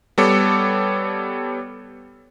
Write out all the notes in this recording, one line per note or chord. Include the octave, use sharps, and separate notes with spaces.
G3 B3 A4 C#5 D6 C#7